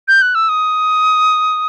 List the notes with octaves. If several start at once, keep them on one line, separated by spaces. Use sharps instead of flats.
G6
F#6
E6
D#6